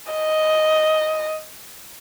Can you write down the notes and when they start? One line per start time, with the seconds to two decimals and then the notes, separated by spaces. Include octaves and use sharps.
0.13 D#5